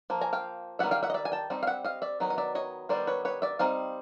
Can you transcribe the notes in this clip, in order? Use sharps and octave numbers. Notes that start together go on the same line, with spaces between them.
F3 A#3
G#5 A#5
F5 G5
D#3 G3 B3 E5 F#5
F5 G5
E5 F#5
D#5
D5 E5
G#5
G5 A5
G3 C4 D#4
F5
E5 F#5
D#5 F5
D5 E5
D#3 F#3 B3 D#4
D#5
D5 E5
C#5 D#5
D#3 G3 B3 C5 D5
B4 C#5
B4 C#5
D5 E5
G3 C4 D#4 D#5 F5